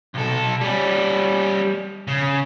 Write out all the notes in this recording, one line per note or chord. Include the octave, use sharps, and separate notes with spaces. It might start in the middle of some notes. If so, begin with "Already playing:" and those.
B1 A4
G3 C#4
C#3